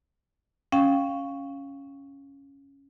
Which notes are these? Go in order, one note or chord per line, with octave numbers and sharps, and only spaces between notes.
C#4 F5 G5